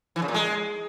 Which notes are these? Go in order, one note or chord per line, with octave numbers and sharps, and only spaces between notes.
E3
C#3
A#2
G#3